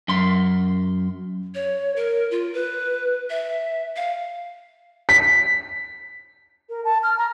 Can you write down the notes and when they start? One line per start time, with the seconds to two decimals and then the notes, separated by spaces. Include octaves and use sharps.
0.08 F#2 C6
1.55 C#5
1.96 A#4
2.31 F4
2.54 B4
3.30 E5
3.96 F5
5.09 B6
6.69 A#4
6.84 A5
7.03 F6
7.18 A#5